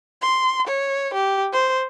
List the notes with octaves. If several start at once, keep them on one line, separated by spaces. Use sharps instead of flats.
C6
C#5
G4
C5